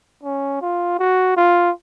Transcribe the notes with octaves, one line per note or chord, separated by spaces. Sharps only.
C#4
F4
F#4
F4